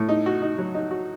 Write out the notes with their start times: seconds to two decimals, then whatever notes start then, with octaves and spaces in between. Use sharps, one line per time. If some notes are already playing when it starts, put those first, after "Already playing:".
Already playing: A2
0.09 D#4
0.26 F#4
0.42 D#4
0.58 F#3
0.74 D#4
0.91 F#4